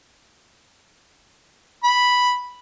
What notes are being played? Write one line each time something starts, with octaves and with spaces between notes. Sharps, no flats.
B5